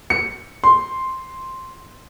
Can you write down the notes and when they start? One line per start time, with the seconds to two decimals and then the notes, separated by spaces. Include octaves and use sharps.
0.10 C#7
0.64 C6